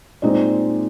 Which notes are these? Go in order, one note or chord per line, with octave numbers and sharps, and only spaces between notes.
A#2 G#3 C4 D#4 D5